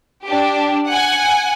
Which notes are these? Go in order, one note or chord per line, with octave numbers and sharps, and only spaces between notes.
D4 G4
F#5 G#5